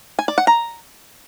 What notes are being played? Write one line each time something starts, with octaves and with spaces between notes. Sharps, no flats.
G#5
D5
F#5
A#5